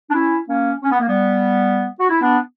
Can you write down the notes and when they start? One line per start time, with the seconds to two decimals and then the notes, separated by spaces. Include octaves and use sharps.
0.09 D4
0.13 C#4 E4
0.48 A#3 C#4
0.83 C#4
0.91 B3
1.00 A#3
1.08 G3 B3
2.00 F#4
2.10 E4
2.21 B3 D4